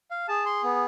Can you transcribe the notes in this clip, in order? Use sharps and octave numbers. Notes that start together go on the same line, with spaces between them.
F5
G#4 A5
C6
B3